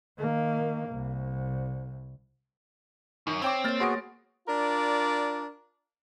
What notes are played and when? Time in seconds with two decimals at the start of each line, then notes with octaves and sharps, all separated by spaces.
0.18 D#3 A#3
0.89 C2
3.27 F#2 D#3
3.42 C4 C#5 G5 D6
3.64 A#3 C#5 F6 A6
3.80 B3 F#4 G#4 C6 A#6 D7
4.48 D4 F4 A#4 D5